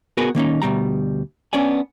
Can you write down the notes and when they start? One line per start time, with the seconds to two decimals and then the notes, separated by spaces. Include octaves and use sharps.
0.17 B3 F#4 G#4 A#4 B4
0.35 D#3 A#3 C#4 D#4
0.62 D2 B2 G3 A#5
1.53 B3 C#4 D4 D5 G#5